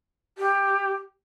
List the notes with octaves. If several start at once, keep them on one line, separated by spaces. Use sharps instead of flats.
G4